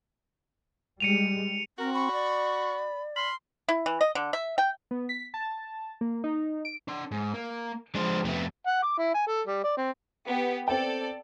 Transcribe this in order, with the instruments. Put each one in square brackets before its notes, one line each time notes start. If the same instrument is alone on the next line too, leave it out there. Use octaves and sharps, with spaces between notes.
[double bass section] G3 G#3 [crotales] C#7 D#7 F7
[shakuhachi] C4 [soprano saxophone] F#4 [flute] A#4
[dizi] B5 [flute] C#6
[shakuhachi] D5
[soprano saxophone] B5 [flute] C6 [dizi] F6
[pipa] E4
E3
D#5
D3
E5
G5
[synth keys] B3
B6
A5
A#3
D#4
D7
[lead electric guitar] D4 C6
G#2
A#3
[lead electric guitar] F3 G#3 [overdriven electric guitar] D4 C5
[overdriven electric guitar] F2 A3 [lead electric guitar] B3 G4
[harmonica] F#5
D6
E4
G#5
A4
G3
D5
C4
[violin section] B3 G4
[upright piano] C4 G5 [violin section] A4 D5